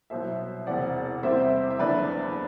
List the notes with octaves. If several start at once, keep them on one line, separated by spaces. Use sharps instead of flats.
C2 B2 F#3 C5 E5
E1 E2 C3 D5 F#5
E2 C3 G3 C4 E4 C5 E5
E5
F#1 E2 D3 B4 D5